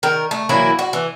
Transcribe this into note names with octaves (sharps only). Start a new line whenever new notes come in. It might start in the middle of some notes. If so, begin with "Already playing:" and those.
D#3 A#4
A3
E3 F#3 A#3 E4
F#4
E3